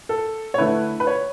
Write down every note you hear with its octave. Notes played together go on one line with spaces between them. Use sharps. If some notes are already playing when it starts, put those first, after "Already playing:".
A4
C#5
D3 A3 E4 B4
B4
C#5